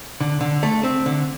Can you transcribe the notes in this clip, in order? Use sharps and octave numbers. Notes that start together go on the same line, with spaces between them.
D3
D3
A3
C4
D3